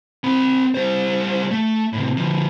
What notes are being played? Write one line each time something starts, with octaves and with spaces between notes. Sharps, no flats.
C4 B5
G3 C5
A3
A2 C3
D3 F3